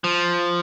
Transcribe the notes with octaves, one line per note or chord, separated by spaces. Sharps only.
F3